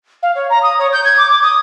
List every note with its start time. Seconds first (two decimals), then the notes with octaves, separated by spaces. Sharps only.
0.23 F5
0.35 C#5
0.50 A#5
0.63 D#6
0.79 C#5
0.93 G6
1.05 G#6
1.17 D6
1.30 D6
1.43 D#6